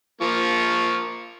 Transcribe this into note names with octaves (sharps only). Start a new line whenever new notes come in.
F3 A#3 C#6